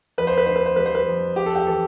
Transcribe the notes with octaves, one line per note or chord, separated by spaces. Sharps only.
F2 B4
C5
B4
D3 C5
B4
C5
G3 B4
C5
B4
F2
F2 G4
A4
G4
E3 A4